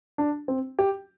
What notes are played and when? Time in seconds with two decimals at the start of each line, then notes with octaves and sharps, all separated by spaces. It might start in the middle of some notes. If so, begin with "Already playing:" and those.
0.18 D4
0.48 C4
0.79 G4